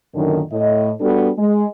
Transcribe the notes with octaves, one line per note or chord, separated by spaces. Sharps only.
F#2 A#2 D3 D#3
A2 D#5
G3 B3 D4 F#4 A4
G#3